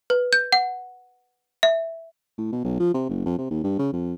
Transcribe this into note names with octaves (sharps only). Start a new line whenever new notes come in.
B4
G6
F#5
E5
A2
B2
B1
F3
C3
F#1
F2
C3
D#2
G2
C#3
F2